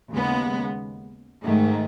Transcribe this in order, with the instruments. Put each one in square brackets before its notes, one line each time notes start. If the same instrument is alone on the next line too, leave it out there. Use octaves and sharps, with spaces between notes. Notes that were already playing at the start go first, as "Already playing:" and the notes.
[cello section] D#2 C#3 G#3 B3
G#2 D#3 A3